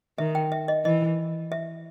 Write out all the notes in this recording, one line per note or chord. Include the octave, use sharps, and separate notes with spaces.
D#3 E5
G5
E5
D#5
E3 D#5
E5